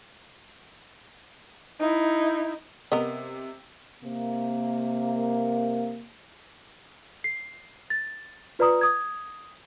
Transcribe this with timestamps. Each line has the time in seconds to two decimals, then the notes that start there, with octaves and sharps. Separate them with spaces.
1.80 D#4 E4
2.92 C3 B3 A#4 D#5
4.03 C3 A#3
7.24 C7
7.90 A6
8.59 F4 B4 D5 A#5 D#6
8.81 D#6 G#6